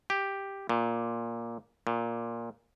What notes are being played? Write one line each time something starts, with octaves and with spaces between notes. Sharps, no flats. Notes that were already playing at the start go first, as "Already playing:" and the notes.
G4
A#2
A#2